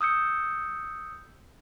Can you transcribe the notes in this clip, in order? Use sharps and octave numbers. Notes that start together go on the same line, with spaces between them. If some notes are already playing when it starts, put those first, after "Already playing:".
D#6 E6 G6 C#7